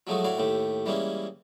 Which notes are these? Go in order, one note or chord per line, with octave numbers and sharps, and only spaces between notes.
F3 F#3 G#3 A3 D#4 F#4
A2 E4 F#4 D5 F5
D#2 A2 A3 G4
E3 G3 G#3 A#3 C#4 E4